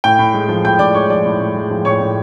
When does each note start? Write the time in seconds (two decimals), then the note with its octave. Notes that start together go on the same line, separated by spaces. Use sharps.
0.04 A2 G5 G6
0.19 A2
0.34 G#3
0.49 F3
0.65 A2 G5 G6
0.79 A2 D5 D6
0.95 G#3 C#5 C#6
1.10 F3 D5 D6
1.26 A2
1.41 A2
1.56 G#3
1.71 F3
1.85 A2 C#5 C#6
2.01 A2